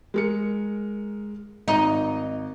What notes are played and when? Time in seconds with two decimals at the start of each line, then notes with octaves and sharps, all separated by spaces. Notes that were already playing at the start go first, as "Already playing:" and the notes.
0.14 G#3 A#4 C#7
1.68 G#1 D#4